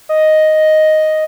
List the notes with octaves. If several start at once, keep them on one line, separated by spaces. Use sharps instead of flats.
D#5